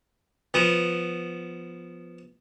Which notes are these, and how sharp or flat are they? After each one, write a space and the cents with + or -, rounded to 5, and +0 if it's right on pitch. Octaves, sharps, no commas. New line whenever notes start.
F3 +0 B3 +0